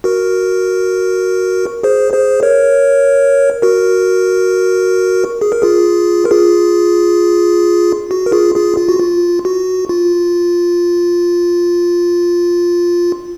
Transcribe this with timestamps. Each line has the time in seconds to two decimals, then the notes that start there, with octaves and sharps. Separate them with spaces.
0.04 F#4 A#4
1.83 G#4 C5
2.13 G#4 C5
2.43 A#4 C#5
3.62 F#4 A#4
5.41 G#4
5.52 A#4
5.62 F4 G#4
6.25 A#4
6.31 F4 G#4
8.11 F#4
8.26 A#4
8.32 F4 G#4
8.55 F4 G#4
8.77 F4
8.89 F#4
8.99 F4
9.45 F#4
9.89 F4